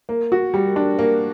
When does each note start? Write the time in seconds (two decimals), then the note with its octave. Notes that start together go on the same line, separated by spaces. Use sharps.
0.09 A#3
0.32 F#4
0.54 G3
0.76 D4
0.99 A#3